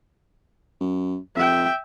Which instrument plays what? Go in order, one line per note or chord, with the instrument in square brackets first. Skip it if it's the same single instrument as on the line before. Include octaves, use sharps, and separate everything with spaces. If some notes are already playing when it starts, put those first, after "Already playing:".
[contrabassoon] F#2
[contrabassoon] F2 [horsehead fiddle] E5 G5